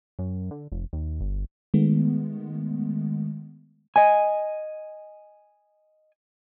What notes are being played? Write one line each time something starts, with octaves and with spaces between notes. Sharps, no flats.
F#2
D3
F1
D#2
G1
D#3 G#3 A3 B3
D#5 G#5